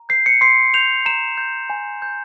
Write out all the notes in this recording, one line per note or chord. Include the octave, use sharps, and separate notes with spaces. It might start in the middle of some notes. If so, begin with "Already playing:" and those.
Already playing: A#5
G6 C7
C#7
C6 C7
G6 F7
A#5 E7
G6
G#5
G6